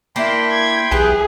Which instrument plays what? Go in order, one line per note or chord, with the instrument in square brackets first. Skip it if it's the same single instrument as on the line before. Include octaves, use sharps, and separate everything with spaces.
[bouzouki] A#3 D4 E4 [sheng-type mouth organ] G5 B5 C6
[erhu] G#6
[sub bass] B1 [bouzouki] E3 G4 B4 [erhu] G#4